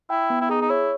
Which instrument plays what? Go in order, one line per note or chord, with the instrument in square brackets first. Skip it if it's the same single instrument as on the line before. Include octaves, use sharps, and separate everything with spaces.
[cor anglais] E4 [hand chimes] G5
[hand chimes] B3
[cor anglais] E4
[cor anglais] D#4 [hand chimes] G#4
[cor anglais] D#4
[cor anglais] E4 [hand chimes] C#5